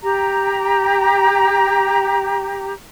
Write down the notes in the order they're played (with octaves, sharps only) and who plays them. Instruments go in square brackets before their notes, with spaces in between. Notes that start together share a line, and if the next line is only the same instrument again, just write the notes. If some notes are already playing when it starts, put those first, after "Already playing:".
[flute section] G4 A#5